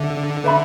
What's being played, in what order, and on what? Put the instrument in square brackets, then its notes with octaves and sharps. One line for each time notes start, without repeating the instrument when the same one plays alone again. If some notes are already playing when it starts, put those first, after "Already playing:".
Already playing: [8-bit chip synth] D3 [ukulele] E5
[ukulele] B4 E5 B5